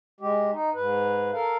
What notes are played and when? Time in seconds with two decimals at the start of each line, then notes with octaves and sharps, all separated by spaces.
0.21 G#3 G4
0.52 D#4
0.74 G#2 B4
1.33 A4 A#4 F5